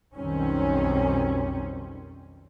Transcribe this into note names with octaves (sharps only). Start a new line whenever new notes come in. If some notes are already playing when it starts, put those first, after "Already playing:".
B1 F2 D#3 G3 C4 C#4